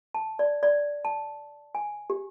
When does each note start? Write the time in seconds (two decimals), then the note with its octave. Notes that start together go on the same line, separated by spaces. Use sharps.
0.15 A5
0.39 D5
0.63 D5
1.05 A5
1.75 G#5
2.10 G4